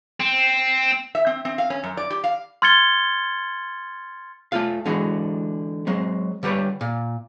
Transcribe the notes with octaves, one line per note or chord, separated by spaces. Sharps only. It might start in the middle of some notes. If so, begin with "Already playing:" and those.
C4
E5
C4
C4
F5
C#4
F#2
D5
G4
F5
C6 F6 G#6 A6 C#7 G7
A3 F4 F5
D3 E3 G#3 F#4
F#3 G#3 C4
D3 G3 G4 B4 C#5
A#2